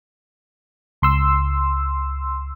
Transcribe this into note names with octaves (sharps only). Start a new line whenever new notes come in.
C#2 C6 E6